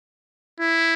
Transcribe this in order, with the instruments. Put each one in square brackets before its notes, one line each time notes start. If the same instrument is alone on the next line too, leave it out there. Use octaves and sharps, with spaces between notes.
[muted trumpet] E4